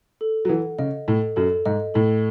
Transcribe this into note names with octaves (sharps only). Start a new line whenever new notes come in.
A4
F#3
E3 F#5
C#3 D#5
A2 A4
F#2 A4
G#2 D#5
A2 A4